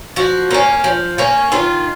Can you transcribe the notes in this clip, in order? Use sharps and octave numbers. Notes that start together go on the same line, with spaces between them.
F3 F#4
A#3 C#4
F3
A#3 C#4
D#3 F4